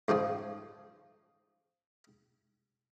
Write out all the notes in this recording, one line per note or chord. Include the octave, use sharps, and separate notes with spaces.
G#2 C#3 F3 G#3